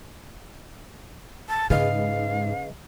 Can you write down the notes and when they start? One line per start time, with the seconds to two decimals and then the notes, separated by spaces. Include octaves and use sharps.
1.49 A5
1.70 G#2 C#3 G#4 B4 D#5 F5